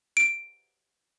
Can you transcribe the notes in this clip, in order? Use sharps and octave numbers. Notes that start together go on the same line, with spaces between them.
D7